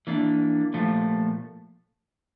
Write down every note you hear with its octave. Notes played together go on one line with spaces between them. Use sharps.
E3 A#3 D4
A#2 F3 A3